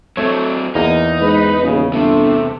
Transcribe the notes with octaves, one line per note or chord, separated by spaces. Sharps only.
F#3 A3 C4 C#5
E2 A#3 D#4 D#5
G#2 B4
D#1 C#3
G1 C3 A3